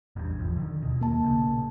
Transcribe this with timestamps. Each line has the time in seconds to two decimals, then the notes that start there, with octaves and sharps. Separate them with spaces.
0.16 A1 E2 G2
0.39 F1 E2 F3
0.56 D3 D#3
0.82 D#2 B2
1.01 A#3 A5
1.24 A#1 C#3 A3